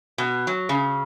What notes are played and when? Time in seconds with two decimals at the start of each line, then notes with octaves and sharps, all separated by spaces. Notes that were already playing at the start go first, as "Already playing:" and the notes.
0.18 B2
0.47 F#3
0.69 C#3